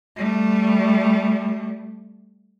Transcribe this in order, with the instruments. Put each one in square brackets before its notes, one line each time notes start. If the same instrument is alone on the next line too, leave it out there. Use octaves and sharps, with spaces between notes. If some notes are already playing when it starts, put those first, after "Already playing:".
[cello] G3 A3